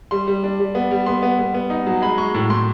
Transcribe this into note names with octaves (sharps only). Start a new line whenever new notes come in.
G3 C6
G3
D4
G3
B3
G3
B3 C6
B3
B3
B3
D#4
F#3
G#3 B5
G#3 C#6
A2
A2 C6